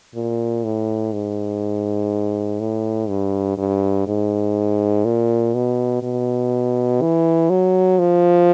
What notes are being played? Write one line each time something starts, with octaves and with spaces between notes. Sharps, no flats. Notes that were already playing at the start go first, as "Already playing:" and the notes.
A#2
A2
G#2
A2
G2
G2
G#2
A#2
B2
B2
E3
F#3
F3